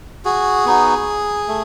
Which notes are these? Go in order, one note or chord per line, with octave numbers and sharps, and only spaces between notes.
F#4 G#4
B3 D#4 F#4
A3